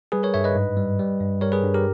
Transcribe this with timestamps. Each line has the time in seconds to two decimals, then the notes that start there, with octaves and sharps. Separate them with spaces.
0.12 G3 G#4 B4
0.23 A#4 C#5
0.34 G2 C#5 E5
0.44 B4 D#5
0.55 G#2
0.77 G3
0.99 G3
1.21 G2
1.41 G3 A#4 C#5
1.52 G#4 B4
1.63 G2
1.74 G4 A#4